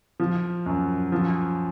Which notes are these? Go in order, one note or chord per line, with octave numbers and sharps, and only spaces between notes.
F3
F#2
F3